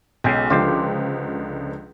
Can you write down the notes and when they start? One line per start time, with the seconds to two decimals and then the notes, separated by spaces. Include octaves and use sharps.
0.24 B1 C#3 G#3 G5
0.50 C#2 D3 F3 F4 G4 C5